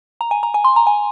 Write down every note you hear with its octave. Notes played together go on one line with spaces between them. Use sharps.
A#5
G#5
A#5
G#5
C6
A#5
G#5